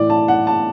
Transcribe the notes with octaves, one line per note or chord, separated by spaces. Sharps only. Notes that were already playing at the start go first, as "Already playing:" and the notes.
Already playing: A2 E3 D5
A5
F#5
A5